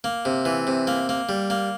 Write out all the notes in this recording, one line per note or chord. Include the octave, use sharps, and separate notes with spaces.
A#3
C3
E3
C3
A#3
A#3
G3
A#3